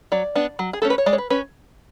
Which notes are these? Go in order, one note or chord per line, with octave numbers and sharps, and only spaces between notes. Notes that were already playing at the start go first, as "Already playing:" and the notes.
F#3 D5
B3 D4
F#3
G#4
A3 C#4 A4
B4
C#5
G#3 D5
C#5
B4
C#4 B4